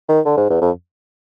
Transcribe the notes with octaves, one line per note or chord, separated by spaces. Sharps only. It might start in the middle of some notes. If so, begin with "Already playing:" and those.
D#3
D3
G#2
E2
F2